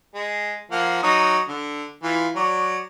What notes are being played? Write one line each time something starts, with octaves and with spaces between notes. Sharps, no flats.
G#3
F3 A#3 F#5
F#3 D#4 D#6
D3
E3 F4
F#3 D5